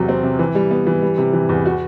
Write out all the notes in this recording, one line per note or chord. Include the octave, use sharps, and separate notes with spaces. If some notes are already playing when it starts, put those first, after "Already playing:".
Already playing: E2 C3 F#3
C4
C3
E3
G3
B3
E3
G3
C3
E3
E2
F#4